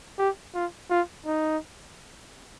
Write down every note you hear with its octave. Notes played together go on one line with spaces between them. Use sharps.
G4
F4
F4
D#4